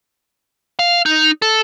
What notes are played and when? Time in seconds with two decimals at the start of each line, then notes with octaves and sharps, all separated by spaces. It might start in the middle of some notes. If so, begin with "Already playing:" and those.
0.79 F5
1.06 D#4
1.42 A4